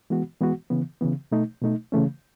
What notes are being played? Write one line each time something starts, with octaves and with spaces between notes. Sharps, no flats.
E3 G#3 B3 F#4
E3 G#3 B3 F#4
C#3 E3 B3
C#3 E3 B3
B2 A3 D#4
B2 A3 D#4
C#3 E3 A3 C#4